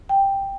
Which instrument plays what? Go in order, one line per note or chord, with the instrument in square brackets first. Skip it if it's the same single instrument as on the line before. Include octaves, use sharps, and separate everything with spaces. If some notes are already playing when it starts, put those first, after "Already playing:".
[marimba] G5